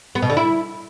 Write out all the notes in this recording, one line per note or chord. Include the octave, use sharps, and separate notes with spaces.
B3
B2
D3
E4